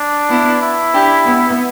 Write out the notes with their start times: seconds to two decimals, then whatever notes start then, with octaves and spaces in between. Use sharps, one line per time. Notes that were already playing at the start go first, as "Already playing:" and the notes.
Already playing: D4
0.29 B3 E4
0.61 E4
0.93 D4 G4
1.26 B3